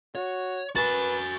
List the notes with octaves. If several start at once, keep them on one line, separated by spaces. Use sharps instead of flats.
F#4 C#5
F#4 B4 G#5 A5